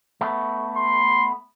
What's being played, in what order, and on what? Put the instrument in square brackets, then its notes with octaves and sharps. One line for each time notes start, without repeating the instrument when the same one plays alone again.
[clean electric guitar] A3 B3
[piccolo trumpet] C6